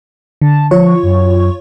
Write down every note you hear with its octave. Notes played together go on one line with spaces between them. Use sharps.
D3 A5
F3 F4 C#5 C#6
F#2